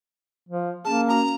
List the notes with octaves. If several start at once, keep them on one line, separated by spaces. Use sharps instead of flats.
F3
A#3 C#4 G#4 A5
C#4 F#4 A#4 A#5